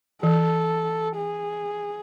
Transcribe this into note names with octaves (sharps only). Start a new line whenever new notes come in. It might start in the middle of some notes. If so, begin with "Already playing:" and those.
E3 A4
G#4